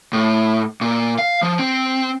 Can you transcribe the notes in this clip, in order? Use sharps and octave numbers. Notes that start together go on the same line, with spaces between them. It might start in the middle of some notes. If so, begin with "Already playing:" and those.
A2
A#2
F5
F3
C4